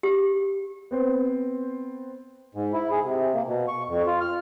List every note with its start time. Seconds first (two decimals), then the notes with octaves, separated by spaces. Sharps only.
0.03 G4
0.91 B3 C4 C5
2.55 G#2
2.73 E4
2.91 G#4
3.04 C3
3.34 A#3
3.47 B2
3.68 C#6
3.88 F2
4.07 F4
4.21 F6